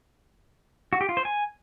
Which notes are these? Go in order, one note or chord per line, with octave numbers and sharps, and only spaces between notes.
F#4
G4
F4
C5
G#5